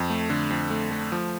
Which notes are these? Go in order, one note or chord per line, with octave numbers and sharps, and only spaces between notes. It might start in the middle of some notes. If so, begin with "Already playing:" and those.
Already playing: F2
A3
D3
F2
A3
A3
F3